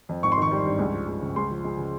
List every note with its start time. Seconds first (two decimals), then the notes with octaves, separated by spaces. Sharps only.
0.09 F2
0.23 G#1 C#6
0.32 C6
0.37 D#3 C#6
0.52 G3
0.66 G2
0.79 C#2
0.93 F3
1.08 C#2
1.21 C#3
1.36 C#2 C6
1.51 F3
1.64 G#3
1.78 C#3